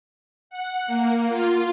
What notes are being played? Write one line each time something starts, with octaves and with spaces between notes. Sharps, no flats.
F#5
A#3
F4